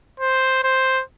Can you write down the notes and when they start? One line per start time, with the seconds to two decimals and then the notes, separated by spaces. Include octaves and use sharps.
0.20 C5
0.64 C5